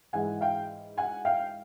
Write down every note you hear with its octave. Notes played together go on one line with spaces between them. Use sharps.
G#2 E3 G#3 F#5 G#5
F5 G5
F#5 G#5
F5 G5